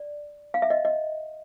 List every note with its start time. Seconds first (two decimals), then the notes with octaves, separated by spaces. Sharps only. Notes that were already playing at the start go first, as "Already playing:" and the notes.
Already playing: D5
0.54 F5
0.62 E5
0.70 D#5
0.85 D#5